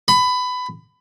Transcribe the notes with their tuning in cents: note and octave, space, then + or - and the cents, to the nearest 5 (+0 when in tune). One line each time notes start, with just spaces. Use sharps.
B5 +20